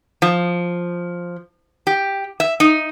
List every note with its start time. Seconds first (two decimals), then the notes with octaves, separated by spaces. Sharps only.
0.22 F3
1.87 G4
2.40 E5
2.60 D#4